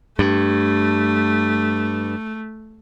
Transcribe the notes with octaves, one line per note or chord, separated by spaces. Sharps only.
G2 A3